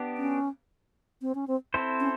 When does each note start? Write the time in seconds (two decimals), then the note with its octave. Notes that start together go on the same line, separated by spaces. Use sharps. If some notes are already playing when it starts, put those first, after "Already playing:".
Already playing: B3 D4 G4
0.18 C#4
1.22 C4
1.35 C#4
1.48 C4
1.74 C4 E4 A4 C5
2.00 C#4